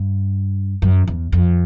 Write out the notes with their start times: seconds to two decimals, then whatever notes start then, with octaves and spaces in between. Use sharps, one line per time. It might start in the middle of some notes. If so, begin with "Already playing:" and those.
Already playing: G2
0.82 F#2
1.07 E2
1.32 F2